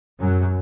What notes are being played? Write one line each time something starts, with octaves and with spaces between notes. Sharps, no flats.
F#2 F#3